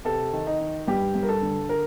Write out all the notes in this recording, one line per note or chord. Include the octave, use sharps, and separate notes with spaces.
C3 A4
D#3
D#4
D#3
G2 G4
G2
A#4
A4
D3
A#4